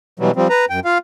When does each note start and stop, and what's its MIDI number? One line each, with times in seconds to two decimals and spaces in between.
0.19 0.31 47
0.19 0.31 52
0.19 0.31 54
0.19 0.31 55
0.36 0.48 53
0.36 0.48 55
0.36 0.48 60
0.49 0.65 71
0.49 0.65 82
0.70 0.80 42
0.70 0.80 79
0.85 0.98 65
0.85 0.98 77